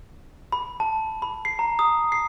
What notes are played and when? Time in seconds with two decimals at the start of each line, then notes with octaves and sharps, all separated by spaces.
0.52 B5
0.80 A5
1.22 B5
1.45 C7
1.59 A#5
1.79 D#6
2.12 C7